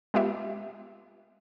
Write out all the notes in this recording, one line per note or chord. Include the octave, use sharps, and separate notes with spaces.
G#3 B3 F4 G4 E5